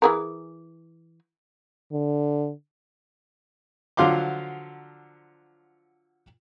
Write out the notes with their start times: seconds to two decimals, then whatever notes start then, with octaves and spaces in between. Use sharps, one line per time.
0.02 E3 G#4 A#4
1.92 D3
3.97 D3 F3 F#3 F5 C6 D6